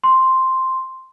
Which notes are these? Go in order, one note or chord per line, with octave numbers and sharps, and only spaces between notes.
C6